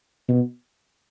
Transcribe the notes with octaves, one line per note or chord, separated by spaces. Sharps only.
B2